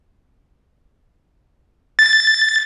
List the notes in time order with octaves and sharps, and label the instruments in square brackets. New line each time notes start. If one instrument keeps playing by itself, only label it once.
[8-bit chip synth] A6